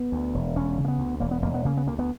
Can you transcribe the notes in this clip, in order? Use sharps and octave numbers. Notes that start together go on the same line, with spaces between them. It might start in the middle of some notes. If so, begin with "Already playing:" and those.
Already playing: B3
D2
E1
E1 C#4
C#3
A#3
B3
D2
E1 A#3
B3
E1 A#3
B3
C#3 A#3
B3
D2 A#3
B3